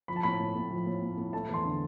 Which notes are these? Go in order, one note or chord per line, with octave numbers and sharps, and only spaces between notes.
F3 B5
A5
A2 B5
A2
A2
F3
A2
A2
A2
A3 A5
E2 C6
D3